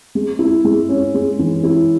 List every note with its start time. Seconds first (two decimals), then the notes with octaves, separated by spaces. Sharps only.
0.15 G#3
0.39 E4
0.65 G#3
0.89 C#4
1.14 G#3
1.39 E3
1.64 E4